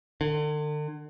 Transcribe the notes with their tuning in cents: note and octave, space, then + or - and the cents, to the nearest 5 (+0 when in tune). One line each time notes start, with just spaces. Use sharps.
D3 +40